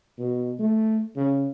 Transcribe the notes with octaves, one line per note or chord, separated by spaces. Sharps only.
B2
A3
C#3